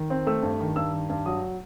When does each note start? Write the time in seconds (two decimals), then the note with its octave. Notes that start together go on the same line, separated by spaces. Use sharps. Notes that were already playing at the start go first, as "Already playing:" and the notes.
Already playing: D#3
0.10 C4
0.27 A3 E6
0.43 G2
0.60 D#3
0.76 G2 E6
0.93 D#3
1.10 G2
1.26 F#3 D#6